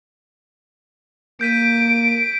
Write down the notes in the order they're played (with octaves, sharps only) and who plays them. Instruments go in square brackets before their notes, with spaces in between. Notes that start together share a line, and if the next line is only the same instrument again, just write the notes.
[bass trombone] A#3 [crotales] G6 B6 D#7 [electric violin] D7